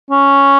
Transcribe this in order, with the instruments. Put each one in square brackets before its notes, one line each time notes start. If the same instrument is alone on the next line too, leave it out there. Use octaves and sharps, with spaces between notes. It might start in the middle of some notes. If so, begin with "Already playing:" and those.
[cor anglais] C#4